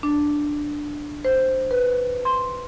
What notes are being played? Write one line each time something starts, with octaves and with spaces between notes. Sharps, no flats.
D4
C5
B4
C6